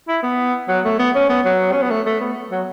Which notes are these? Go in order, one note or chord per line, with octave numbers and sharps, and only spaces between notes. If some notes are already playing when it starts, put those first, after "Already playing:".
E4
B3
F#3
A3
B3
C#4
B3
F#3
C#4
B3
A3
A3
B3
F#3